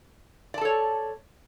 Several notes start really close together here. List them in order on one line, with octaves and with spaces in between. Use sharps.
D5 A5 A4 C#5